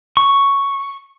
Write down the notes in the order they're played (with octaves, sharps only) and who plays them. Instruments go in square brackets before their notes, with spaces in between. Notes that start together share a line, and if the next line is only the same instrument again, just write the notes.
[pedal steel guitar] C#6